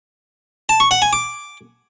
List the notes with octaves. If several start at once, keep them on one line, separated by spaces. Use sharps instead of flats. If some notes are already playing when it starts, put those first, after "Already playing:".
A5
C#6
F#5
G#5
D6